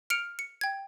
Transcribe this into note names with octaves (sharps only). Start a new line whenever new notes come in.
F6 C#7 D7 F7
C#7
G5 G#6